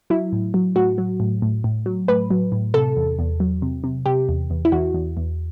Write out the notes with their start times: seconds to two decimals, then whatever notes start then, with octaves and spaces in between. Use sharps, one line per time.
0.10 F#3 E4
0.32 A2
0.54 F#3
0.76 A2 F#4
0.98 F#3
1.20 A2
1.42 A2
1.64 A2
1.86 F#3
2.08 A2 B4
2.31 F#3
2.52 A2
2.74 C3 A4
2.97 E2
3.19 E2
3.40 F#3
3.62 C3
3.84 C3
4.06 C3 G4
4.29 E2
4.50 E2
4.65 E4
4.72 E2 F#4
4.94 E2
5.17 E2